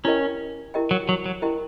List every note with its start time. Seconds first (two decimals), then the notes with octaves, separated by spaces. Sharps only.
0.04 C#4 E4 G4 A#4 D#5 G5
0.74 E4 G4 A#4 D#5 G5
0.91 F#3
1.09 F#3
1.26 F#3
1.42 E4 G4 A#4 D#5 G5